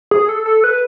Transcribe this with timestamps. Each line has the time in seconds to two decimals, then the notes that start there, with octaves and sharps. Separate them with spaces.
0.11 G#4
0.29 A4
0.46 A4
0.64 B4